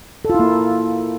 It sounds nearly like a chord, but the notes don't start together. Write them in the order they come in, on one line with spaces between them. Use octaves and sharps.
A4 F4 E4 A#3